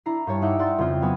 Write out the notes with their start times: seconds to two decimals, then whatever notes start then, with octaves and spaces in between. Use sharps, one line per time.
0.06 D4 E4 A#5 C7
0.27 G2 G4 C#5 A5
0.42 D#4 E5 F#5 G5 A#5 D6
0.59 D5 F#5 G5 C6 E6 A6
0.78 F2 C#3 F3 C4 F4
1.02 F#3 B3 G#5 D#6